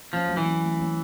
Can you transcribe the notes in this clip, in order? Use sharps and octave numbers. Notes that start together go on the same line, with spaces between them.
F3 C#4
F#3
E3
C#4
A3
C#4